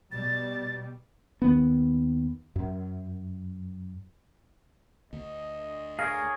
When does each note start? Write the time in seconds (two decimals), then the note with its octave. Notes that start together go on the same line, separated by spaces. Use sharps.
0.12 B2 G3 A6
1.42 D#2 D#3 B3
2.56 F#2
5.13 D2 D#5
5.99 G#4 A#4 C#5 F5